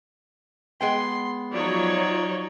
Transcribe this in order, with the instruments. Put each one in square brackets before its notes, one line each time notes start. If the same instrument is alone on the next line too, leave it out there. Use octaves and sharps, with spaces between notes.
[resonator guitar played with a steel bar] G#3 B3 G5 [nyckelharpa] C6
[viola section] F3 F#3 C#5 [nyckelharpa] D#4 D5